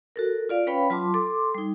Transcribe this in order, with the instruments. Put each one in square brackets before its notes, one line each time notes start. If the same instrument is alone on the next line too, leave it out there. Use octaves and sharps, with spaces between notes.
[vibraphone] F#4 A4 A#4
F4 D5 F5
C#4 B4 C#5 F5 G5 B5
F#3 F4 A5 C6 D6
A4 C6 D6
G3 D#4